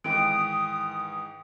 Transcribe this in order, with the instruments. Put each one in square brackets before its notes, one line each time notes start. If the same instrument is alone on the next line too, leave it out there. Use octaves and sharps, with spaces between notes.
[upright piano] G#2 D#3 E3 [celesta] G5 D7 [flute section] D#6